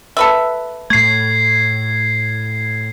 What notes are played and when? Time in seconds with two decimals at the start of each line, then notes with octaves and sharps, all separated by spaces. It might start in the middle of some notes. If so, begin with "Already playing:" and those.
0.17 A4 B4 E5
0.90 A2 A3 G#6 C7